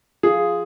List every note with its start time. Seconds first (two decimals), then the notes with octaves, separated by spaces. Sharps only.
0.23 F4 G#4